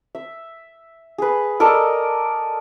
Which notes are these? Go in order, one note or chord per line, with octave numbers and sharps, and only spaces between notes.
E5
G#4 B4
A4 A#4 D5 D#5